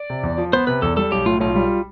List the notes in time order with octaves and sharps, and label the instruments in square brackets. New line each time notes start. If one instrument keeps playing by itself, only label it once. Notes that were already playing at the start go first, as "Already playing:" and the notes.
Already playing: [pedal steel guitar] D5
[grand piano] C3
E2
F3
[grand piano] B3 [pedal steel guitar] C5
[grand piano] C3 [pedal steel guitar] B4
[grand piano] E2 [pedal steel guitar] A4
[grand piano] G3 [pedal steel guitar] A4
[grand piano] B1 [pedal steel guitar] G4
[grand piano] A2 [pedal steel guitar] F4
[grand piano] B1 [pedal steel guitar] F4
[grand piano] G3